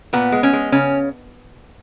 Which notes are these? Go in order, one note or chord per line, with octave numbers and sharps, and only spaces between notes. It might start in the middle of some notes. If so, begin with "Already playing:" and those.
A#2 B3
G#3
C#4
G#3
C#3 C#4